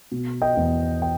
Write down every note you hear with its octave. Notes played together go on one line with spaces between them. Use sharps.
B2
D#5 G5
E2
G5